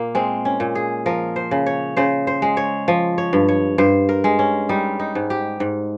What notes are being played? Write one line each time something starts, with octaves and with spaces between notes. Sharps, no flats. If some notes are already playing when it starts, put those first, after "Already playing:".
Already playing: A#2 A#3
G#3 C4
C#4
A#2
G#4
F3 A#4
C5
C#3
C#5
C#3 C5
C5
G#3
C#5
F3
C#5
G2
C#5
G2 C5
A#4
G#3
C#4
G3 D#4
D#4
G#2
G4
G#2